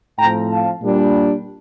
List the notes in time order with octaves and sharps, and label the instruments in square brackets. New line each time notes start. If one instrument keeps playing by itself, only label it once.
[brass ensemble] A2 F3 C4 G5 A#5
F5 A5
A#2 G3 D4